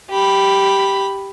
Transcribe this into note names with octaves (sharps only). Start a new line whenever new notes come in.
G4 B5